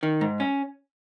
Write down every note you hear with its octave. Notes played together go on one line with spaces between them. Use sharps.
D#3
G#2
C#4